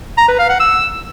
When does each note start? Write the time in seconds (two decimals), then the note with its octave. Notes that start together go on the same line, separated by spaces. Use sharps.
0.18 A#5
0.28 B4
0.39 F5
0.49 F#5
0.60 E6